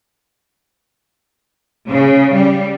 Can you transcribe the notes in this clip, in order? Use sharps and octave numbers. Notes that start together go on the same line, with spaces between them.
C#3
G3